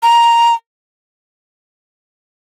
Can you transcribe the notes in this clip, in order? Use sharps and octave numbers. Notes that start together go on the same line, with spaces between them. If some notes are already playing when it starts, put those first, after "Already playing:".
A#5